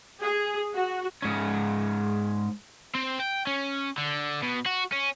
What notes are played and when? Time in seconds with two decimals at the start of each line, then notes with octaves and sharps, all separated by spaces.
0.22 G#4
0.75 F#4
1.22 G#2 C#4
2.95 C4
3.20 G5
3.47 C#4
3.98 D3
4.42 B2
4.66 F#4
4.92 C#4